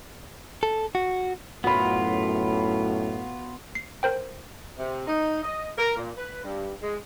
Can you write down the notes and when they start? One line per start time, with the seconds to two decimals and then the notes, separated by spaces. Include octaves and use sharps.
0.63 A4
0.95 F#4
1.64 F#2 A2 B3 F4 F#4 B5
3.75 C7
4.03 A#4 C5 G5
4.77 C3
5.07 D#4
5.43 D#5
5.77 A#4
5.96 A#2
6.17 B4
6.44 G2
6.82 G#3